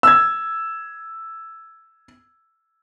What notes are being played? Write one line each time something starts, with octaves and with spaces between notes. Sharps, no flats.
E6 G#6